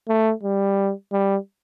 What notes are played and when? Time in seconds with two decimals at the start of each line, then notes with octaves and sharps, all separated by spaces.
0.08 A3
0.43 G3
1.12 G3